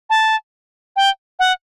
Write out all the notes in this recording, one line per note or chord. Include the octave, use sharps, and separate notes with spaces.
A5
G5
F#5